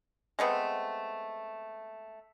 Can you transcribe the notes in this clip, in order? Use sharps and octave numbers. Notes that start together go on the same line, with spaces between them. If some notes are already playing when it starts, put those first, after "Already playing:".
G#3 A3 B3 C4